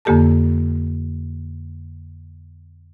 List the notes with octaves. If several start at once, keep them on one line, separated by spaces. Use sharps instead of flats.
F2 D3 A#3 G4 A4 A5